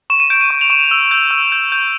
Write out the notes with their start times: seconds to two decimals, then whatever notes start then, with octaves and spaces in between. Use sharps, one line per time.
0.10 C#6 E7
0.20 D#7
0.30 G6 D7
0.41 D#7
0.50 C#6
0.61 F7
0.70 C#6 E7
0.91 E6
1.11 G6
1.31 E6
1.52 G6
1.72 G6